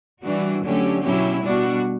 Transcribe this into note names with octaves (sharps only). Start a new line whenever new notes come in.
E3 G3 D4 F#4
D3 F#3 A3 C#4 G4
B2 F#3 C#4 E4 G4
B2 G3 D4 F#4